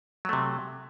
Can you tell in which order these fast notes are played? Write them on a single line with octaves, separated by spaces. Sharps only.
F#3 A3 C3